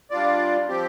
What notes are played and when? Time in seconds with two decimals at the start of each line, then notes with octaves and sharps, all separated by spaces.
0.11 G3 D4 F4 D5
0.68 F3 C4 G4